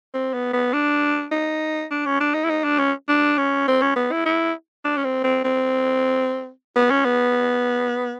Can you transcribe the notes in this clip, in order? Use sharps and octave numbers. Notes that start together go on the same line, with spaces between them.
C4
B3
B3
D4
D#4
D4
C#4
D4
D#4
E4
D#4
D4
C#4
D4
C#4
C4
C#4
B3
E4
E4
D4
C#4
C4
C4
C4
B3
C#4
B3